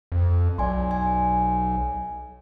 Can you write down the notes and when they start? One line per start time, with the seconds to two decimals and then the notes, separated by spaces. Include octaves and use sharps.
0.12 F2
0.58 B1 D5 G#5 C6
0.91 G#5